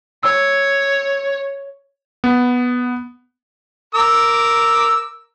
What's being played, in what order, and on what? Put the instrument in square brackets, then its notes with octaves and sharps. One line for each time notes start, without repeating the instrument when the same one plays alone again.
[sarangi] C#5 [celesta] E6
[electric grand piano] B3
[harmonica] A#4 D6 E6